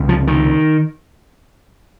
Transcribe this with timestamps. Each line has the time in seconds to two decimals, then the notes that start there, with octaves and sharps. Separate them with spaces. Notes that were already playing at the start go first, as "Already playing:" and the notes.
Already playing: C#2 C3
0.09 F3
0.27 D#3